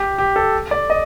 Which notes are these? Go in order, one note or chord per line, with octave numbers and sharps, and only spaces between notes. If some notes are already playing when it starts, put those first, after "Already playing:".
Already playing: G4
G4
A4
D5
D#5